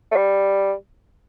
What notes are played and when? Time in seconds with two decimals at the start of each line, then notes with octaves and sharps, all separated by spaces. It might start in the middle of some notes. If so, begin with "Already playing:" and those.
0.11 A3
0.16 G3